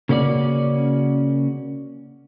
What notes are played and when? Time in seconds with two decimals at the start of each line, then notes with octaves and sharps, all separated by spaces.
0.09 C#3 A#3 C#4 F#4 D5